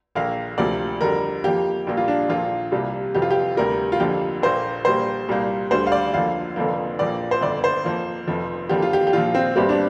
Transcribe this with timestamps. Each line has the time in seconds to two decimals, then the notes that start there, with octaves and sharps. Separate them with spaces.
0.15 A#1 A#2 A#3 F5
0.58 D2 C3 F3 A#3 D5
1.01 F2 D3 G3 A#4
1.44 F2 F3 A#3 G4
1.87 A#1 A#2 G3 A#3
1.97 F4
2.08 D4
2.28 A#1 A#2 F3 A#3 F4
2.72 C2 C3 G3 A#3
3.14 F1 F2 C3 F3 G4
3.22 F4
3.30 G4
3.57 D2 C3 G3 A#4
3.92 F4
3.99 F2 D3 F3 A#3 G4
4.42 A#1 A#2 A#3 C5
4.85 A#1 A#2 G3 A#3 C5
5.29 C2 A#2 G3 A#3
5.71 D2 D3 G3 C5
5.87 F5
5.92 D5
6.14 F2 D3 F3 A#3 F5
6.56 F1 F2 D3 F3 A#3
6.99 A#1 A#2 F3 A#3 D5
7.31 C5
7.41 G1 F2 D3 D5
7.64 C5
7.84 F2 F3 A#3
8.28 F1 F2 F3
8.69 F2 D3 F3 A#3 G4
8.82 F4
8.93 G4
9.07 G4
9.13 A#1 A#2 F3 F4
9.35 C4
9.56 G1 G2 G3 A#3 C4
9.69 D4